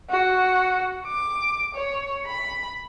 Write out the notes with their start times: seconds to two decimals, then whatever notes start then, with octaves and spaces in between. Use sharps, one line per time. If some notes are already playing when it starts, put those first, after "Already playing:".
0.10 F#4
1.07 D6
1.76 C#5
2.26 B5